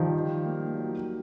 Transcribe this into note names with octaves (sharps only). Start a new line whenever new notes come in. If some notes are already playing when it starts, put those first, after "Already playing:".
Already playing: D#3 F3 G3
D#4
A#3
F#3